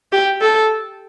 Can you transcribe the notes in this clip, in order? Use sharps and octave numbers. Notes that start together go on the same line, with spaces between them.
G4
A4